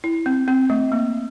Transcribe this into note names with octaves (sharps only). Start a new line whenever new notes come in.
E4
C4
C4
A3
A#3